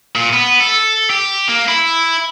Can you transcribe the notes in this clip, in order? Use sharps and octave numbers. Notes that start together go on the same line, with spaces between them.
A#2
B3
A4
G4
A#3
E4